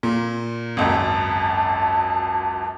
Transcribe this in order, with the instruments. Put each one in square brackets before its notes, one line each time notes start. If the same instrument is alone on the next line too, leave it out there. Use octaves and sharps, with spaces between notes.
[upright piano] A#2
[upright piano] G#1 C#2 F#2 [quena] A5